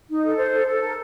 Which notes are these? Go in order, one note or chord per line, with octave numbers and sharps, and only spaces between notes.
D#4
A4
C5
A4
A4
A#4